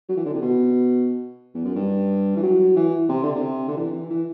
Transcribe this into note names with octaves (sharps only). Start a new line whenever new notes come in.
F#3
E3
D3
C3
B2
E2
F#2
G2
E3
F#3
E3
C3
D3
C3
D3
E3
E3
E3